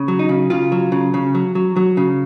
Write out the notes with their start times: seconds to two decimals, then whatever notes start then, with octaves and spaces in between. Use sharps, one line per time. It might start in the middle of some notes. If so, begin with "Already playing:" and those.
Already playing: C#3
0.08 F#3
0.19 D#4
0.29 C#3
0.50 C#3 F4
0.72 F#3
0.92 C#3
1.14 C#3
1.35 F#3
1.55 F#3
1.76 F#3
1.97 C#3